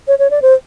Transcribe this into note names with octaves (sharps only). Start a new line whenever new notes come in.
C#5
C#5
D5
C5